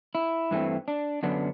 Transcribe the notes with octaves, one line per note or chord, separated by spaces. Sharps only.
E4
G2 E3 A3 C4
D4
F#2 D3 F#3 B3 D4